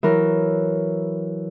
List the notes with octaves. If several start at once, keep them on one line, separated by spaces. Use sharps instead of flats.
E3 F#3 A#4